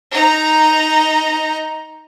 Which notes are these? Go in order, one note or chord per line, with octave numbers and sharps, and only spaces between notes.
D#4 A#5